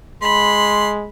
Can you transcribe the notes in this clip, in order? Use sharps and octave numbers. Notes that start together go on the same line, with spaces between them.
G#3 B5 C6